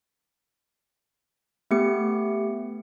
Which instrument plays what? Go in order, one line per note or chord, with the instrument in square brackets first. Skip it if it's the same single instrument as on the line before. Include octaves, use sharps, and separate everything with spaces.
[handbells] A3 B3 G4 C#7